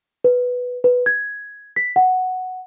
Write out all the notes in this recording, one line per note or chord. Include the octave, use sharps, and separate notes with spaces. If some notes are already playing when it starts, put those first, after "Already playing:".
B4
B4
G#6
B6
F#5